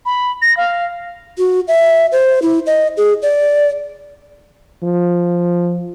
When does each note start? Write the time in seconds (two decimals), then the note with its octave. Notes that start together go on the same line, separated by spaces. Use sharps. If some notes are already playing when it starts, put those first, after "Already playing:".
0.06 B5
0.42 A#6
0.57 F5
1.38 F#4
1.68 E5
2.12 C5
2.42 E4
2.66 D#5
2.97 G#4
3.22 D5
4.84 F3